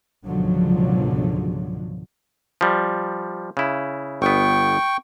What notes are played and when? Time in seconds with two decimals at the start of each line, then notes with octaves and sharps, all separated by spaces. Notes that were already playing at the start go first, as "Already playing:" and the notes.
0.24 C#2 G#2 B2 D3 F3 F#3
2.61 F3 G3
3.57 C#3 E4
4.22 G1 B3 G5 C#6